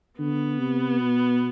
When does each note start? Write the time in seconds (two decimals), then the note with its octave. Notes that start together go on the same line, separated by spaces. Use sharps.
0.19 D3 B3
0.59 C3
0.99 B2